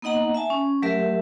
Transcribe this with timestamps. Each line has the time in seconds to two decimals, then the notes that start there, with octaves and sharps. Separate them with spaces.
0.02 A#3 B3 D#4 D#5 F#5 A#5
0.34 E5 G#5 A5
0.50 C#4
0.82 F#3 A3 G4 A#4 E5